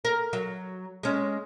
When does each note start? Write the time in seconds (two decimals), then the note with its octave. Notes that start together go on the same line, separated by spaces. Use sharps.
0.05 A#4
0.33 F#3
1.03 G#3 C#4